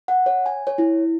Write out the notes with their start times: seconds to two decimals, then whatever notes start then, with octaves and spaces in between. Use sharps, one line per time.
0.08 F#5
0.26 C#5
0.46 G#5
0.67 C#5
0.78 E4